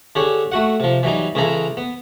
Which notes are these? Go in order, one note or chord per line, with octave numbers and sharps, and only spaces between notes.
D3 G4 G#4 C#5
A3 F#4 F#5
C3 F3
E3 F#3 G3 D#4
C#2 C#3 E3 G#4 A4 A#5
B3